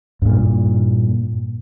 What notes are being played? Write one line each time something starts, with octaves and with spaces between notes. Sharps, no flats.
G2 A#2